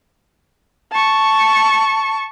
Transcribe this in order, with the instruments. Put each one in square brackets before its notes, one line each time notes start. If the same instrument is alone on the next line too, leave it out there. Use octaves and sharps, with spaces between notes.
[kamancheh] A5 C#6